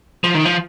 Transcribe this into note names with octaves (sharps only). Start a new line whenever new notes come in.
F3
D#3
F3